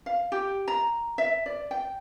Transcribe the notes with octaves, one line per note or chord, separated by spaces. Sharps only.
F5
G4
A#5
E5
D5
G5